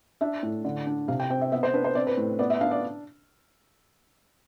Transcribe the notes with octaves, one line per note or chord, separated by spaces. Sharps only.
D4 E5
A2
D3
D4
C3 F5
G5
C4 G5
E5
B3 E5
C5
D4 B4
C5
C4 D5
B4
A2
B3 D5
E5
D4 F5
D5